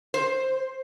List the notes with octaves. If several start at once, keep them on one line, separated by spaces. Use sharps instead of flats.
C5